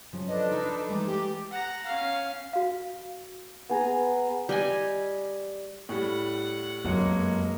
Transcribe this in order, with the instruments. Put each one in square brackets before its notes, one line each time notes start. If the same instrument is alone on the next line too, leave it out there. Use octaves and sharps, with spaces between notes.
[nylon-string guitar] C#3 F3 F#3
[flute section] D4 A4 B4 [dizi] D#5
[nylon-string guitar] F3 [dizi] D#4
[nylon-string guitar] E3 G#3 A3 [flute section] D6
[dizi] G4
[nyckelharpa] F#5 A#5
C#4 F5
[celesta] F#4 F5
[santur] B3 G#4 G#5 A#5
[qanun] G3 D#5 G#5
[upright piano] A2 G3 [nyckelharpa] F#5
[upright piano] F1 F#3 C#7 [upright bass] F#2 [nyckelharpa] G#3 A#3